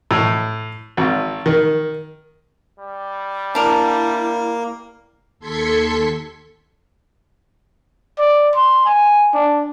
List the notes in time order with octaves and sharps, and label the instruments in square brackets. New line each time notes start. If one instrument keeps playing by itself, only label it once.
[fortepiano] A2
G#1
D#3
[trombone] G3
[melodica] A#3 [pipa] D4 A#4 [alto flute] E4
[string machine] D#2 A4 C6 G#6 B6 C#7
[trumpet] D5
C6
G#5
D4